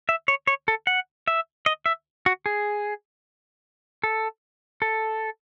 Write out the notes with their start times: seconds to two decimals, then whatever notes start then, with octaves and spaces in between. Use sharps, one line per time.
0.09 E5
0.28 C#5
0.47 C#5
0.68 A4
0.87 F#5
1.28 E5
1.66 D#5
1.86 E5
2.26 F#4
2.46 G#4
4.04 A4
4.82 A4